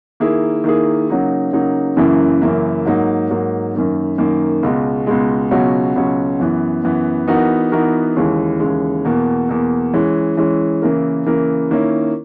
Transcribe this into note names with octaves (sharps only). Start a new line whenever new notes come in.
D#3 A#3 E4 G#4
D#3 A#3 E4 G#4
C#3 F#3 A#3 D#4
C#3 F#3 A#3 D#4
F#2 C#3 E3 A#3 E4
F#2 C#3 E3 A#3 E4
G#2 F#3 A#3 D#4
G#2 F#3 A#3 D#4
F#2 D#3 A#3
F#2 D#3 A#3
C#2 B2 G#3
C#2 B2 G#3
C#2 B2 F#3 C#4 F#4
C#2 B2 F#3 C#4 F#4
F#2 E3 B3
F#2 E3 B3
E3 B3 D#4 F#4 A#4
E3 B3 D#4 F#4 A#4
D#2 C#3 E3 G#3
D#2 C#3 E3 G#3
E2 B2 A#3
E2 B2 A#3
E3 G#3 C#4
E3 G#3 C#4
C#3 E3 A#3 E4 A#4
C#3 E3 A#3 E4 A#4
D#3 A#3 C#4 E4